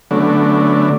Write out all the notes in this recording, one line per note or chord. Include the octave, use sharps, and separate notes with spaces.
D3 F#3 A3 B3 C#4 D4